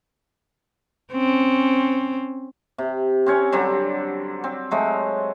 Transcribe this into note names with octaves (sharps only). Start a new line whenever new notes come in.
C4 C#4
C3
C4 C#4 C#5
D3 F#3 G3 C4
C4
F#3 G#3 A3